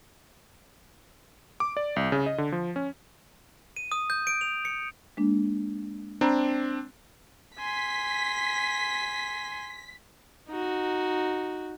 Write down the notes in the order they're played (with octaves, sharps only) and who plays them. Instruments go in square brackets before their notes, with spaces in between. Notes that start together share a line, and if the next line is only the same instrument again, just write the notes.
[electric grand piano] D6
D5
C2
C#3
D#5
D3
F3
C#4
[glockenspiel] D#7
D#6
G6
D7
F7
C#7
[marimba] G#3 A#3 D4
[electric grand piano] C4 D4 [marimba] A#5 B5
[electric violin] G#5 C6 [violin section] B6
[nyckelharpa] D#4 F#4